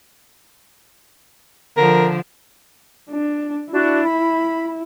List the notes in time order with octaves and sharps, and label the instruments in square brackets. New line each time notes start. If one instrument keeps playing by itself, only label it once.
[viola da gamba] D3 F3 [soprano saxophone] A#4
[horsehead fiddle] D4
[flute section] D4 F#4 [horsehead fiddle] E4
[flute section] B5